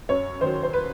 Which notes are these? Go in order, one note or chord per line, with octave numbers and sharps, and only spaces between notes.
F#2 C#5
D#3 F#3 C5
C5
B4